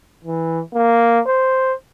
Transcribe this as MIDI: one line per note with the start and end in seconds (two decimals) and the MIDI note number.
0.24 0.61 52
0.74 1.20 58
1.27 1.73 72